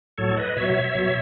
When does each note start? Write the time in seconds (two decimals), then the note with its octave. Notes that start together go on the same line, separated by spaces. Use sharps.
0.18 A2 F#3 A4 C#5
0.37 B4 D#5
0.56 B2 F#3 C#5 E5
0.95 B2 F#3